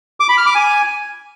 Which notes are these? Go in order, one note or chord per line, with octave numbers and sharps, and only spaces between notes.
D6
B5
F6
D6
G#5